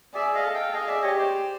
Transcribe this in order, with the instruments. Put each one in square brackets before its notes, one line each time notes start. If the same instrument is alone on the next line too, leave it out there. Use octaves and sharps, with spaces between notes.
[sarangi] G#4 [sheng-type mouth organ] D5 E5
[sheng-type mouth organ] D#5 F5
[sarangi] A4
[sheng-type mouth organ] F5 G5
[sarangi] G#4 [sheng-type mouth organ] D#5 F5
[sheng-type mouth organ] D5 E5
[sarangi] G4 [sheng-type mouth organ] C#5 D#5
[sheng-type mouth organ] C5 D5